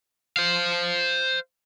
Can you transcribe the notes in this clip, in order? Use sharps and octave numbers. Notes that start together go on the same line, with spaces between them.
C5 F5